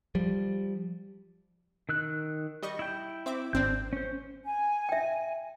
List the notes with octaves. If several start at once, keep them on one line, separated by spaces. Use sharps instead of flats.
F3 G3
D#3 E6 F#6
G3 D#5 C#6
E4 G5
C4 E5 D6
G#1 C4 D4 G6
C#4 C5
G#5
E5 G5